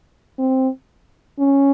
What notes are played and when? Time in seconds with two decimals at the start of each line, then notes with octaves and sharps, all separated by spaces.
0.38 C4
1.39 C#4